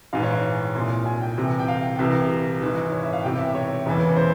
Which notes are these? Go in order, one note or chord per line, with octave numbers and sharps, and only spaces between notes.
A#1 G#2 E3 F5
C#5
F5
C2 A#2 C6
G#5
G5
C2 C3 E3
G5
F5
C2 C3 E3
G#1 G#2 E3
C#5
E5
F5
E1 E2 C3 G5
E5
C#5
E1 E2 C#3 E3
C5